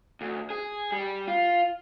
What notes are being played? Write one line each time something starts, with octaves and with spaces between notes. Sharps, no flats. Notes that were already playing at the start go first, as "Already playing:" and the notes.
D2
G#4
G3
F4